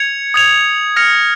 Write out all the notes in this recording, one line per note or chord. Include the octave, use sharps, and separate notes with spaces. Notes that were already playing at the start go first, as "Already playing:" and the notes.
Already playing: G#6 C#7 F7
D#6 G#6 F7
F6 A#6 C#7 F7